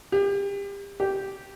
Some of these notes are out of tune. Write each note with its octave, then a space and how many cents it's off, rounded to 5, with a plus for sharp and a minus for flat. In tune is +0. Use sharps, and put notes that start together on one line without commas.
G4 +30
G4 -10